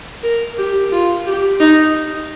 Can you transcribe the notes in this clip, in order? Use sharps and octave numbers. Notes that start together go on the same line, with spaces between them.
A#4
G4
F4
G4
D#4